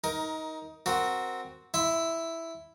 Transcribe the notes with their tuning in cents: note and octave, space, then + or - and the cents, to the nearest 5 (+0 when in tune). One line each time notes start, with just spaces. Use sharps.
D#4 +20 A#4 +10
C4 +0 F#4 +0 A#4 +0
E4 +0 E5 +0 C6 -25